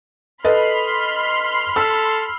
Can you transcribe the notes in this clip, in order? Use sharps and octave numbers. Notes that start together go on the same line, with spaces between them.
A4 B4 D#5 B5 C6 F6
A4 E6